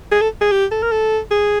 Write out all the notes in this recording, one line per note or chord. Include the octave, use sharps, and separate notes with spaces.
G#4
A4
G#4
G4
A4
A#4
A4
G#4